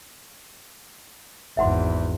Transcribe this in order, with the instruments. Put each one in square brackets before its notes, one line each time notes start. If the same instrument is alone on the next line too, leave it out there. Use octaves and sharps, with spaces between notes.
[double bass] G#1 E2 [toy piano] E5 F#5 C6